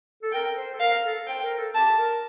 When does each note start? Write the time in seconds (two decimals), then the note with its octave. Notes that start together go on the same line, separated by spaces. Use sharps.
0.23 A4
0.33 A#4 G5
0.56 C5
0.74 A4
0.80 A#4 F5
1.04 A4
1.27 C5 G5
1.43 A#4
1.59 A4
1.74 G4 A5
1.99 A#4